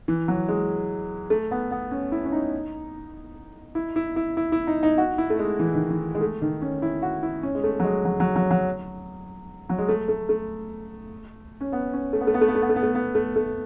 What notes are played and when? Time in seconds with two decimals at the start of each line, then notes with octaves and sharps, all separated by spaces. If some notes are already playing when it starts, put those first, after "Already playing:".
0.08 E3
0.28 F#3
0.48 G#3
1.30 A3
1.51 B3
1.71 B3
1.91 C#4
2.12 E4
2.25 C#4
2.32 D#4
3.75 E4
3.96 E4
4.16 E4
4.37 E4
4.52 E4
4.67 D#4
4.83 D#4
4.98 F#4
5.18 E4
5.30 A3
5.39 G#3
5.59 E3
5.75 D#3
5.90 E3
6.15 G#3
6.21 A3
6.42 D#3
6.62 C#4
6.82 E4
7.02 F#4
7.23 E4
7.43 C#4
7.55 G#3
7.64 A3
7.80 F#3
7.84 G#3
8.05 F#3
8.20 F#3
8.36 F#3
8.51 F#3
9.69 F#3
9.79 G#3
9.89 A3
10.08 A3
10.29 A3
11.61 C#4
11.72 B3
11.93 C#4
12.13 A3
12.21 B3
12.27 A3
12.34 B3
12.41 A3
12.48 B3
12.55 A3
12.62 B3
12.70 A3
12.76 B3
12.83 A3
12.95 B3
13.15 A3
13.36 A3